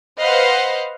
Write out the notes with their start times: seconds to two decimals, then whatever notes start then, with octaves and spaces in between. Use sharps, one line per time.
0.20 B4 C5 D#5 F5 F#5